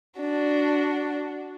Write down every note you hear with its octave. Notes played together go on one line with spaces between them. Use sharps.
D4 F#4